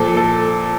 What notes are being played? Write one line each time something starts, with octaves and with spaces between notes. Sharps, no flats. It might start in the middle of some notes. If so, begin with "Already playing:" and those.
Already playing: A#2 F3 A4
A4